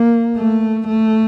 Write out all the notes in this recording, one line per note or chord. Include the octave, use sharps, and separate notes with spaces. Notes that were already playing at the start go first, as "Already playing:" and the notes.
Already playing: A#3
A3
A3